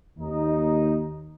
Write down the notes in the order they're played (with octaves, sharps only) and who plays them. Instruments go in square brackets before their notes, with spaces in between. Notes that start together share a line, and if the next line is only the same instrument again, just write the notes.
[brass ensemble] D#2 D#4